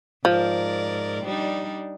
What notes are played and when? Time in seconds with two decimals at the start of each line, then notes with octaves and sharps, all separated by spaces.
0.25 G#2 F3 A#4 D5
1.24 G3 D4 D#4